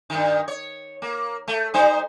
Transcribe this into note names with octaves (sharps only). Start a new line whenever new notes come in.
G2 D#3
C#5
A#3
A3
G3 D#4 C5